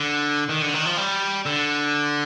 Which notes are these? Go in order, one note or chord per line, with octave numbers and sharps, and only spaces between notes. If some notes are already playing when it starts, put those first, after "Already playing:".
Already playing: D3
D#3
D3
D#3
F3
G3
D3